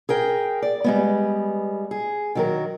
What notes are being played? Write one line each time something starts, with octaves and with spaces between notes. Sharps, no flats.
G#4 A#4 G5
D5
G3 G#3 B3
G#4
D#3 F#3 A#4